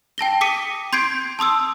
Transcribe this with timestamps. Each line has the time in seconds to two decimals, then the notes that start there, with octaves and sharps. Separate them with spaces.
0.18 G5 A5 A#6 G7
0.41 D6 D#6 B6 C#7 D#7
0.93 C6 G6 G#6 C7 D7
1.39 A5 C6 D#6 E6